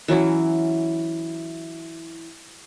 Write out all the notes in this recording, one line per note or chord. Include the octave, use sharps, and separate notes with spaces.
E3 F#3 C#4 E4